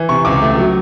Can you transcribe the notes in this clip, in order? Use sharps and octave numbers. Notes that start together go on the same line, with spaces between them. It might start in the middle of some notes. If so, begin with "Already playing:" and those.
Already playing: E3
C3 C#6
C#2 D6
A3
F#3